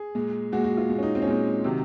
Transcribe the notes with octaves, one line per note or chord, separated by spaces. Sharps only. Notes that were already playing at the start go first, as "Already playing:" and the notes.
Already playing: G#4
A#2 G#3
A#2 G#3 F#4
F#4
F4
A#2 G#3
C#4
D#4
C4
C#4
A#2 G#3 C4
C3 D#3 F#3